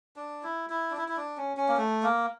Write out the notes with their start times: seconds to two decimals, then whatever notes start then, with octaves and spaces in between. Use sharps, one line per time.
0.16 D4
0.43 E4
0.70 E4
0.91 D4
0.97 E4
1.08 E4
1.17 D4
1.37 C#4
1.57 C#4
1.69 A#3
1.77 A3
2.03 A#3